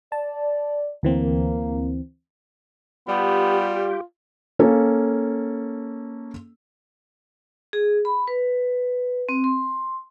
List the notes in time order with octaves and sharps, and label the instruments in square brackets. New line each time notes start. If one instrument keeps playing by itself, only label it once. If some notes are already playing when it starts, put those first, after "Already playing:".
[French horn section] D5 [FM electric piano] A5
[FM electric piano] D2 E3 C4 [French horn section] A#3
[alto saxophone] G3 [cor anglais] B3 [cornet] F4 [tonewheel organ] G4
[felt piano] A#3 C#4 A4
[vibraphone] G#4
B5
B4
C4
C6